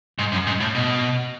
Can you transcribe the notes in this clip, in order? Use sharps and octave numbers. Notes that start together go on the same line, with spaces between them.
G#2
F#2
G#2
A2
B2